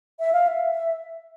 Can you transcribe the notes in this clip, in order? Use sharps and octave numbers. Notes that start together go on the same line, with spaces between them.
E5
F5
E5